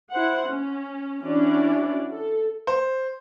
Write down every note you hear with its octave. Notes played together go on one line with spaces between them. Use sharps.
E4 C5 F#5
C#4
E3 C#4 D4 E4 F#4 D5
A4
C5